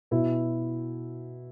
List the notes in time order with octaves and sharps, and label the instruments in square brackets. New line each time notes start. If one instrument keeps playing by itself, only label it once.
[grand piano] B2 E4